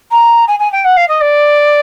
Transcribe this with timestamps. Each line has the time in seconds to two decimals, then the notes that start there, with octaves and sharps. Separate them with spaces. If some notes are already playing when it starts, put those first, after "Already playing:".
0.11 A#5
0.48 G#5
0.60 G#5
0.72 G5
0.85 F#5
0.97 F5
1.08 D#5
1.21 D5